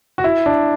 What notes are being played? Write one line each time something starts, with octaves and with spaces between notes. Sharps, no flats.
F#4
E4
D4